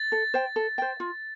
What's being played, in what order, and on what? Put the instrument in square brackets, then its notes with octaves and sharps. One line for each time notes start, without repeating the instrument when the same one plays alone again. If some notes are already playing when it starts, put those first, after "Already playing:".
Already playing: [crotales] A6
[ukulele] A4
C5 G5
A4
C5 G5
F4